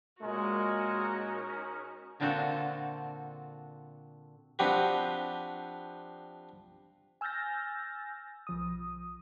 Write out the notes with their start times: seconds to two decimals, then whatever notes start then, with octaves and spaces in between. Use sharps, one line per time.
0.22 A#2 G#3 C#4 D#4 F#4 A#4
2.20 A#2 D3 C4 F4 F#4 A4
4.59 F3 C4 D4 F#4 G4 B4
7.21 G#5 E6 F6 G6 A6 A#6
8.47 B1 F3 D#6